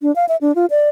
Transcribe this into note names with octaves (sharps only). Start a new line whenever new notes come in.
D4
F5
E5
D4
F4
D5